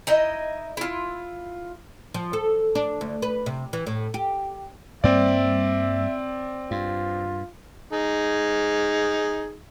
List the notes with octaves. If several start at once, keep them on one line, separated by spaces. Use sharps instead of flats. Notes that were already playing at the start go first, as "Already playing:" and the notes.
D#4 E4 D#5
E4 F4
F3
A4
D4
D2
B4
C3
E3
A2
G4
G2 G3 A#3 C4 D5 E5
G2 F4
D#4 G#4